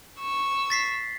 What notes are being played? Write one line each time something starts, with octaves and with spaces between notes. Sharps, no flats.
C#6 E6
A6 B6 C7